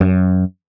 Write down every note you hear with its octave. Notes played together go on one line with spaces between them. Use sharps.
F#2